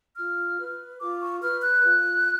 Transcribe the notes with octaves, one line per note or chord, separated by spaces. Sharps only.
F4 F6
B4
F4 D6
C#6
B4 F6
F#6
F4